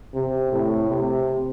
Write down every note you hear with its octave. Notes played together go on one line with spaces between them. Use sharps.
C3
A2
C3